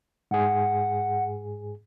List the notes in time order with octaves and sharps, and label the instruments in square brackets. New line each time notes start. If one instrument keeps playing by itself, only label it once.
[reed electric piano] G#2 G#4 [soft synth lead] F#5